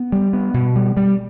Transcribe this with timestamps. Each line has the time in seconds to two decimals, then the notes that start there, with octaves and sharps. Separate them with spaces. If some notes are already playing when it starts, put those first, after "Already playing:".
Already playing: B3
0.12 G3
0.33 B3
0.54 B2
0.76 G3
0.97 G3